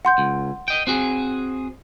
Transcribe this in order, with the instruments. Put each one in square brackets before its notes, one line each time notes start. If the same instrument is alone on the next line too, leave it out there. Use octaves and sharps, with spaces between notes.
[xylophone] F#5 C6 G6
[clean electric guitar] C#2
D#5 G5
C4 F#4 G#4